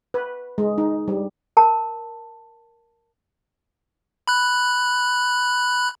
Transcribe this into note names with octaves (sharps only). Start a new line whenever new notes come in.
B4
G#3
D#4
G3
A#4 A5
B5 F#6